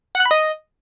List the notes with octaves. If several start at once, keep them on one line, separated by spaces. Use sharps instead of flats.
F#5
F#6
B5
D#5